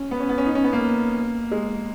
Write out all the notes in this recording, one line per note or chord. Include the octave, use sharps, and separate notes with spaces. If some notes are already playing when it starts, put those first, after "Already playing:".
Already playing: C#4
B3
C#4
B3
C#4
D#4
C#4
B3
A#3
G#3